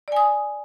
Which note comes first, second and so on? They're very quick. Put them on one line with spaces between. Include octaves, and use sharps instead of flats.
D5 G#5 D#6